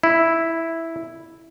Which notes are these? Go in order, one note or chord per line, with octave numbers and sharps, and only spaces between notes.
E4